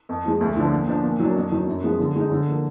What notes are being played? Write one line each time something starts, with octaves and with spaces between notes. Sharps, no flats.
F2
F3 G#3
D2
D3 F3 B3 D4
A#2
F3 B3 D4
A#2
F#3 A#3 D4
F2
D#3 F#3 D4
F#2
F3 G#3 B3
D3
G#3 D#4
D3
F3 A#3